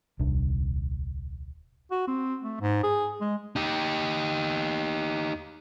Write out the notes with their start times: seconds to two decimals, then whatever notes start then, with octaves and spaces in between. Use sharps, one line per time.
0.20 D#1 C2 D4
1.91 F#4
2.08 C4
2.42 A3
2.61 G#2
2.83 G#4
3.21 G#3
3.56 D#4 G4